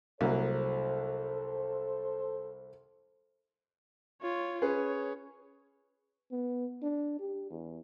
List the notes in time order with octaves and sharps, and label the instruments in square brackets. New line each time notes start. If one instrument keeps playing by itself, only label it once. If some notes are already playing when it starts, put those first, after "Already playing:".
[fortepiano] C2 F#3 A#3 [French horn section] A4 C5
[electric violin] F4 C#5
[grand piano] C#4 G#4 B4 [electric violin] C#5
[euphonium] B3
D4
G4
E2